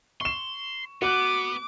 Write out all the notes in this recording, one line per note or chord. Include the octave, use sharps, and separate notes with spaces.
C6 C#6 E7
B3 F#4 D6 F#6